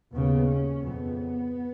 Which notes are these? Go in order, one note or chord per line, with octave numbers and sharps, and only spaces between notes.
D#2 C#3 B3
C#4
F2 C#3 B3